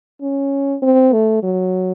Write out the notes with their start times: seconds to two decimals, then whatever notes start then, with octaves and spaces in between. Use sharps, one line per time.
0.21 C#4
0.82 C4
1.13 A3
1.43 F#3